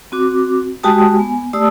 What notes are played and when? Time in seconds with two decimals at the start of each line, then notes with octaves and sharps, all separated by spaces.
0.12 C4 F#4 D6
0.83 G#3 F#4 G4 G5 A5 D#6
1.16 B3 G#5
1.53 A3 G4 D5 A5 D#6 E6